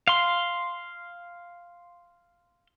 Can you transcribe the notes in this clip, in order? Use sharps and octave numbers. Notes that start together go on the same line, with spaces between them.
F5 C6